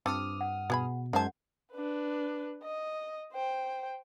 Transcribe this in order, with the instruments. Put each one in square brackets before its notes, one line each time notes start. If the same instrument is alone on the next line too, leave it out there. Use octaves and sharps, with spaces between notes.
[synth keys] G2 D#6 F6 [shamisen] C4 F4 A4 [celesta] D6
[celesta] F#5
[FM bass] B2 [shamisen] B3 G#4 B5
[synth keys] F#2 C5 G#6 [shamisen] D#3 A5 [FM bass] G#3 [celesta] F#5
[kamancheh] D4 B4
D#5
C5 G5